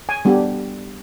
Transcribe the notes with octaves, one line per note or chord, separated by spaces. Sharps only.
G#5
G3 B3 D4 G4